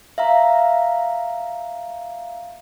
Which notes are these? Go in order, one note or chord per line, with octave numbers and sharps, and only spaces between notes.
E5 F5 A#5